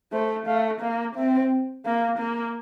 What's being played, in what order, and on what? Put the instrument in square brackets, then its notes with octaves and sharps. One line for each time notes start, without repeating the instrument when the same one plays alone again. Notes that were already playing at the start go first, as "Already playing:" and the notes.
[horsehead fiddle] A3 [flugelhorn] C5
[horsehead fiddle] A3 [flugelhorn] F5
[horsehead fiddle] A#3 [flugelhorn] F5
[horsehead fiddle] C4 [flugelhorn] E5
[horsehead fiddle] A#3 [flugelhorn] F5
[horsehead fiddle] A#3